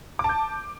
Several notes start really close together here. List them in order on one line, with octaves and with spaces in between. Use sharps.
D6 A5 G6